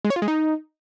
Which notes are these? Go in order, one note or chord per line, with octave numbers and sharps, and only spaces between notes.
G#3
C#5
F4
G#3
D#4